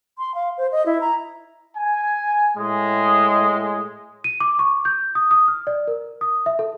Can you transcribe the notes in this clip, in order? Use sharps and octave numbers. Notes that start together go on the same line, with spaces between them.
C6
F5
C5
D#5
E4
A#5
G#5
A2 G#3
D#7
D6
C#6
G6
D#6
D#6
F6
D5
A#4
D#6
E5
A4